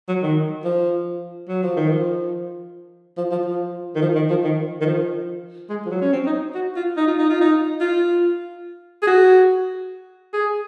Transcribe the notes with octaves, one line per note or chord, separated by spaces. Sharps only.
F#3
D#3
F3
F#3
F3
D#3
F3
F3
F3
F3
D#3
F3
D#3
F3
D#3
D#3
F3
G#3
F3
F#3
C#4
C4
D#4
F#4
F4
D#4
F4
D#4
F4
D#4
F4
G#4
F#4
G#4